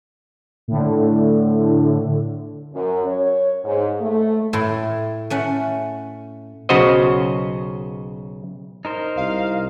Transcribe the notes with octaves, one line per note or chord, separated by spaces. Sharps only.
A2 D3
F#2
C#5
G#2
A3
A2 E4 C6
A3 C#4 F#5
B1 C#3 F#4 C5 D#5
D#4 A#4 C5
C2 F5